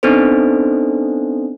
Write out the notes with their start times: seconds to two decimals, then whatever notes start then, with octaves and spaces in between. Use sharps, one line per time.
0.03 B3 C4 D4 D#4 A4 C5